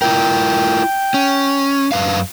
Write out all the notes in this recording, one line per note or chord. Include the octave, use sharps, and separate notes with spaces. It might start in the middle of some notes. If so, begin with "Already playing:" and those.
E4 F4 A#4 G5
C#4
F#2 B4 F5